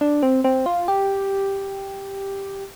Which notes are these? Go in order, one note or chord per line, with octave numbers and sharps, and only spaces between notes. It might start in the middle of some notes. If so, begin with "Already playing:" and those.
D4
C4
C4
F4
G4